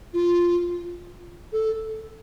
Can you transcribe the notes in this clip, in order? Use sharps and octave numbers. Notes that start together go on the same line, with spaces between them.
F4
A4